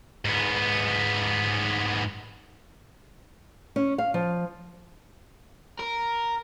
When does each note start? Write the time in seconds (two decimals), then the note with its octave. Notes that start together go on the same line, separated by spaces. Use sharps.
0.25 G#2 B3
3.76 C#4
3.98 F5
4.14 F3
5.80 A#4